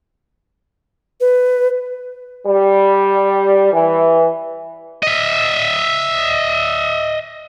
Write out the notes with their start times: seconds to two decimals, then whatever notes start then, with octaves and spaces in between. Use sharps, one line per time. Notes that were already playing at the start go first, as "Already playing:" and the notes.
1.21 B4
2.46 G3
3.73 E3
5.03 D#5 E5